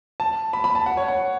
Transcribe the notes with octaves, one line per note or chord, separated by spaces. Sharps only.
A5
B5
B5
A5
F#5
C#5
F#5